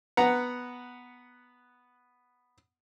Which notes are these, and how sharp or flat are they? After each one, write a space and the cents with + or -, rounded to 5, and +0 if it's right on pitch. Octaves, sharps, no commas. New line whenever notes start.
B3 +0 F#5 +0 A#5 +0